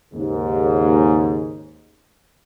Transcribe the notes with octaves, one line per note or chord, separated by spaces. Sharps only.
D#2 G#2 C#3